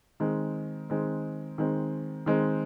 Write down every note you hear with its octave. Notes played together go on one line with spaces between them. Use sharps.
D#3 G#3 C4
D#3 G#3 C4
D#3 G#3 C4
D#3 G#3 C4